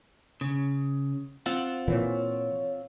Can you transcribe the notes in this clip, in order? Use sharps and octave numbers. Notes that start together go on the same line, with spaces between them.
C#3
C4 F4 F#5
A#2 E3 C#5